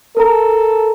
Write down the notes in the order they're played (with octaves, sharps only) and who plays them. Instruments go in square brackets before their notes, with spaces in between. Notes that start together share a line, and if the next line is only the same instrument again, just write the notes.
[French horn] A4 [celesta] A#4 A#5